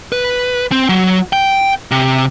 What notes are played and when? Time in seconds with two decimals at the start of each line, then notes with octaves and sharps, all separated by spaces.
0.12 B4
0.72 C4
0.89 F#3
1.33 G5
1.91 C3